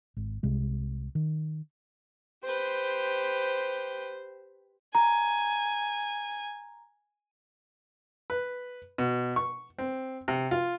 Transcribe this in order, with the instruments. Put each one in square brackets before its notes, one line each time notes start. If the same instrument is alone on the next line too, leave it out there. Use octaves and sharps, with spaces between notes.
[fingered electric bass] G#1
C2 C3 G#3
D#3
[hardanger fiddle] G4 B4 [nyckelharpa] C5
[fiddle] G#5 [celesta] A#5
[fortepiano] B4
B2
C#6
C4
C3
F4